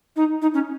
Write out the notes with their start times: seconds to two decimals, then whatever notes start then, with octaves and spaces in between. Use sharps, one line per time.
0.16 D#4
0.42 D#4
0.54 C#4